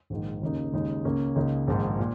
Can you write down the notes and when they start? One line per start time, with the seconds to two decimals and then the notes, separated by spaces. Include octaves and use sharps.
0.10 A#1 G#2 D#3
0.41 D#2 C#3 A#3 D#4
0.73 D#2 C#3 G#3 D#4
1.05 C#2 C#3 A#3 C#4
1.36 C#2 C#3 A#3 D#4
1.68 A#1 G#2 D#3
1.99 A#2